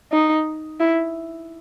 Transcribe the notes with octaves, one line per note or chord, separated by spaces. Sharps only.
D#4
E4